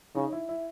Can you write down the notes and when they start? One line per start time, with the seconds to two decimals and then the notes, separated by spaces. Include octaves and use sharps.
0.15 C#3 D#4
0.33 E4
0.49 E4